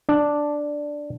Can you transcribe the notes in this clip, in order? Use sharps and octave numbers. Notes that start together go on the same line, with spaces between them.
D4